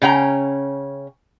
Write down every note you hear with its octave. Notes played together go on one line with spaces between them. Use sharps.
C#3 C#4 G5 A#5